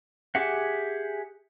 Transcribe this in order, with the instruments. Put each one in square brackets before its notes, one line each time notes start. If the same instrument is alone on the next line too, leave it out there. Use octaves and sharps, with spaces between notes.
[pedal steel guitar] G4 G#4 E5 F#5